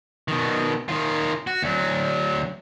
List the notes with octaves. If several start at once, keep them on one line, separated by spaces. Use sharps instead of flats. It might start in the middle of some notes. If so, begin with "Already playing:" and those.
B2 D#3
D#3 F4
F#4
D2 F#3